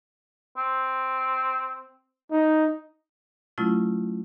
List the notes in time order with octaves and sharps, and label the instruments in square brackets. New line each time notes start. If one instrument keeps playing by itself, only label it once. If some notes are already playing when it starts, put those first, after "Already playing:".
[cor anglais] C4
[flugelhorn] D#4
[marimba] F#3 A3 C#4 E4 F4